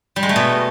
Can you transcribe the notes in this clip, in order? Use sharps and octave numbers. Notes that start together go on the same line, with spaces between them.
G3
G#3
A3
B2